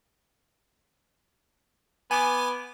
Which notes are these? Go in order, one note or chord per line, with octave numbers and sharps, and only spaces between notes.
B3 G#5 D6